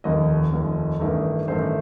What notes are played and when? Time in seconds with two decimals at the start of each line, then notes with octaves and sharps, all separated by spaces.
0.04 F1 D#2 D#3 D#5
0.53 F1 D#2 D#3
1.00 A1 G2 D#3 A3
1.48 A1 G2 D#3 A3 C5